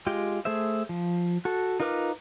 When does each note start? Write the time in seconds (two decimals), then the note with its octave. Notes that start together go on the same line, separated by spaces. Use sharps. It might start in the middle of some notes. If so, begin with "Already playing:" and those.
0.07 G#3 F4 G4 G5
0.45 A3 G#4 C5 E5
0.89 F3
1.45 F#4 A4
1.80 D#4 F4 A#4 B4 D6